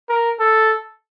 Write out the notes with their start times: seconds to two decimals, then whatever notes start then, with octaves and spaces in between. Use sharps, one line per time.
0.09 A#4
0.40 A4